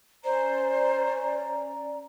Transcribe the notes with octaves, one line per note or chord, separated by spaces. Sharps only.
C#4 C5 D5 A#5